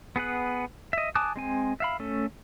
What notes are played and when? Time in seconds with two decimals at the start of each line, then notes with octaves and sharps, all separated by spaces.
0.16 B3 G#4 B4 F#5
0.93 D#5 E5
1.15 G#5 A5 D6 D#6 F#6
1.36 G#3 C4 G#5
1.80 E5 F5 B5
2.00 A3 C#4 A4